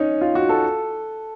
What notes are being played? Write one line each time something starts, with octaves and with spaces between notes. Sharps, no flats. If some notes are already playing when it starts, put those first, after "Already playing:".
Already playing: C#4 D#4
F4
F#4
A4